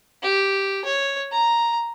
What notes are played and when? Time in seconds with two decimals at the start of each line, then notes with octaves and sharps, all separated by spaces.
0.23 G4
0.85 C#5
1.32 A#5